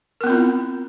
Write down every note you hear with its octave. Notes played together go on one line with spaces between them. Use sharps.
B3 C4 E4 F4 A#4